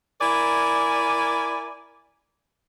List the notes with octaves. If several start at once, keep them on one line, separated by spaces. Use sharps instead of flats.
E4 A#4 D5 G#5